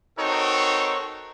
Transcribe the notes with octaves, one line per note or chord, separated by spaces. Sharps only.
C4 D#4 F#4 A4 A#4 C#5